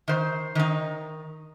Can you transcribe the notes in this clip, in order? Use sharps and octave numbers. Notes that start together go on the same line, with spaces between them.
D#3 C5
D#3 D#4